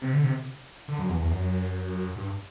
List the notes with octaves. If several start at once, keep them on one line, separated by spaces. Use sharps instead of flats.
C3
D3
C3
D3
F#2
E2
E2
F#2
G2